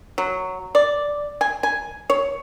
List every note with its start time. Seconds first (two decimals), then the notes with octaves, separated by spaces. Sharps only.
0.18 F#3
0.75 D5
1.41 G#5
1.63 G#5
2.10 C#5